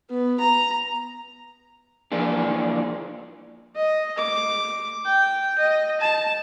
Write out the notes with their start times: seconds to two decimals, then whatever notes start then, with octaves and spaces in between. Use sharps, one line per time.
0.10 B3
0.40 A#5
2.12 E3 F3 A#3 D4 G#4
3.76 D#5
4.18 D6
5.06 G5
5.58 D#5
6.01 A5